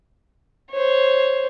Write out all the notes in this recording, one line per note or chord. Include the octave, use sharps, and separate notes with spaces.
C5 C#5